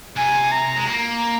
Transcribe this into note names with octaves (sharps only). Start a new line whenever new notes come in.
C3 G#5
A#5
G#3
A#3 A#5